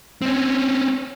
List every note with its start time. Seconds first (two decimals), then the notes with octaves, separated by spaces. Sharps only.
0.22 C4 C#4